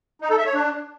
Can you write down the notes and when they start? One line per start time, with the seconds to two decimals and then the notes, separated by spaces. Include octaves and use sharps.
0.22 D#4
0.30 A4
0.38 E5
0.46 C#5
0.54 D4